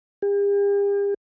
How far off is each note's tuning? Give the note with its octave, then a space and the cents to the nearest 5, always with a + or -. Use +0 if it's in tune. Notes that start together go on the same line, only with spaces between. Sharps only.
G4 +45